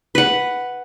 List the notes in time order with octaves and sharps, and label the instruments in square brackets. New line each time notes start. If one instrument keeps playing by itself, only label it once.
[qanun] B4 F#5